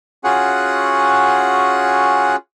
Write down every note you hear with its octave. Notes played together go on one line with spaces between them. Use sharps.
C#4 F4 F#4 G#4 F#5